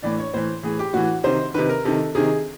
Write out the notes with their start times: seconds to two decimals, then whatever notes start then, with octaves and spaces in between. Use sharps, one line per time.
0.03 A2 E3 D5
0.19 C#5
0.34 A2 E3 C5
0.63 A2 E3 G#4
0.79 G4
0.93 A2 E3 F#4
1.24 C3 D#3 C5
1.54 C3 D#3 B4
1.69 A#4
1.85 C3 D#3 A4
2.15 C3 D#3 G#4